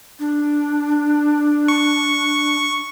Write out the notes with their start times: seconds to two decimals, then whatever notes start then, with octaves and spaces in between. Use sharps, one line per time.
0.19 D4
1.68 C#6